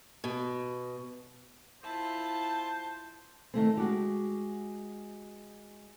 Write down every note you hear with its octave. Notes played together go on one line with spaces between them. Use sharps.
B2
E4 F4 C5 A5
D#3 A3 C4
G#3 F#4 G4